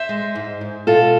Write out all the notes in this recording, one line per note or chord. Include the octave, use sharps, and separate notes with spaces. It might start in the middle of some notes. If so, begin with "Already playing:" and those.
Already playing: C5 E5
G#3
G#2
G#2
B2 F4 A4